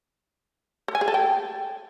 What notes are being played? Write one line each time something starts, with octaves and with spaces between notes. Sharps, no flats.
A4
G#5
G#4
A4
G5